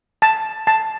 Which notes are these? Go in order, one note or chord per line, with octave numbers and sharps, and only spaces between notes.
A5
A5